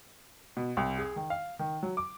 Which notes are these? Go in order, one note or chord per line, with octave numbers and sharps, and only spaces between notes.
B2
C2
G#4
D#3
F5
D#3
F#3
D6